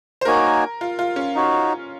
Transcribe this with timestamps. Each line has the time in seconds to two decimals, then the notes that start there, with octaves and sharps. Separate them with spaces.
0.21 C5
0.25 A#3 D#4 F#4 A#4 C#5 G#5
0.81 F4
0.99 F4
1.16 C#4
1.35 D#4 F#4 C#5